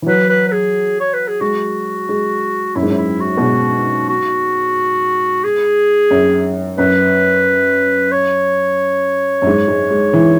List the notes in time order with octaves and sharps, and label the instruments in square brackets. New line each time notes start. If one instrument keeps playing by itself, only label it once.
[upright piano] E3
[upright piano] F#3 [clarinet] B4
[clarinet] B4
B4
G#4
C#5
B4
G#4
[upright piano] G#3 [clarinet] F#4
[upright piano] G#3
[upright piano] F#2 [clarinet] E4
[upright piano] G#2
F#2
[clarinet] E4
F#4
[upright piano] B2
G#2
[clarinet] F#4
G#4
[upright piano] F#2
[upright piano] F#2 [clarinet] B4
[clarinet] C#5
[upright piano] F#2
G#2
G#3
G#3
E3